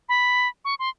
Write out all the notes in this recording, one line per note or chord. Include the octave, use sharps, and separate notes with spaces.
B5
C#6
C6